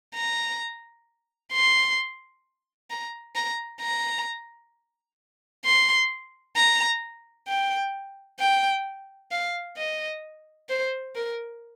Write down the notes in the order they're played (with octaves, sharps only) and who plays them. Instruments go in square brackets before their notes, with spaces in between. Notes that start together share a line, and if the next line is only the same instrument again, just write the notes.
[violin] A#5
C6
A#5
A#5
A#5
C6
A#5
G5
G5
F5
D#5
C5
A#4